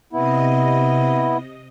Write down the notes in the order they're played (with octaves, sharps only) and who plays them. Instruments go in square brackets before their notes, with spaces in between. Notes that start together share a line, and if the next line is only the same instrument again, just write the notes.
[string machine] C3 D#5 [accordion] B3 E4